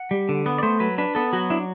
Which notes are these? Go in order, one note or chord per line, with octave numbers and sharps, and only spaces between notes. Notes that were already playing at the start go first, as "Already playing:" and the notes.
Already playing: F#5
G3
D3
B3
D5
A3 C5
F#3 B4
D4 B4
B3 A4
F#3 F#4
D4 E4